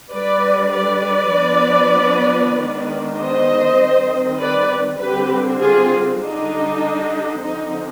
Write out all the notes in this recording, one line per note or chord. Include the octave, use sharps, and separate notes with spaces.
D3 G3 D4 B4 D5
B4 D5
F3 B3 D4
D#3 G#3 B3 D4
C5 D#5
D#3 G3 C4
B4 D5
D3 G3 C4 G4 B4
F4 G#4
D3 G3 D4 D#4
D3 F3 C4 D#4